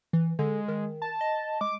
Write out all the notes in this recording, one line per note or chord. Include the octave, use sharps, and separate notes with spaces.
E3
D3 G#3
D#3
A5
D#5
G#3 D6